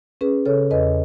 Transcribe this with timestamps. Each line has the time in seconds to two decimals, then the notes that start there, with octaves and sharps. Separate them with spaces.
0.21 C#4 G#4 B4
0.46 C#3 A4 C#5
0.71 E2 B4 D#5